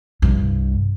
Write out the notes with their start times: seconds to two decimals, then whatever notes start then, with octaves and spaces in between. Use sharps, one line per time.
0.22 C2 G2